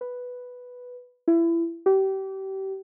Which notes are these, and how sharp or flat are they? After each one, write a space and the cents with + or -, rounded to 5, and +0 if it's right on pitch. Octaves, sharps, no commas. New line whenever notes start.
B4 +0
E4 +25
G4 -30